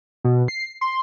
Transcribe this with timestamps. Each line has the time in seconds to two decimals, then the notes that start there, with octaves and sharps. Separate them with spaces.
0.24 B2
0.48 C7
0.81 C6